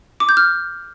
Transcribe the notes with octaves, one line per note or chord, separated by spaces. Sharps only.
D6
G6
F6